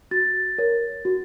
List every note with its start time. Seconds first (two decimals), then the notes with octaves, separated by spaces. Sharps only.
0.11 F#4 A6
0.58 A#4 C#5
1.05 F#4